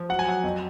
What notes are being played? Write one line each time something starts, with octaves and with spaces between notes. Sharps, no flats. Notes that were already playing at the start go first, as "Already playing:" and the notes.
Already playing: F3
F#3 F#5
G#5
F#3 F#5
F2